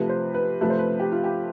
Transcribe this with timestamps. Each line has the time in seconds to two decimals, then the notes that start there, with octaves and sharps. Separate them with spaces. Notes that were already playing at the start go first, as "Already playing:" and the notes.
Already playing: C3 F3 A3 B4
0.09 C5
0.34 B4
0.61 C3 F3 A3 B4
0.70 C5
0.79 B4
1.00 G4
1.12 F4
1.24 G4